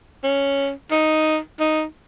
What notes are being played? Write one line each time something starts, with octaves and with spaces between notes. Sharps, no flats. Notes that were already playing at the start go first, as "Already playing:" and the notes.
C#4
D#4
D#4